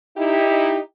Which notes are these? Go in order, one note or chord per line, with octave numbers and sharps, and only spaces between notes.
D#4 E4 G4